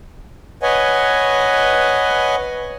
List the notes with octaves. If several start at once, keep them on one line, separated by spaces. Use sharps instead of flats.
B4 C#5 D#5 F#5 G#5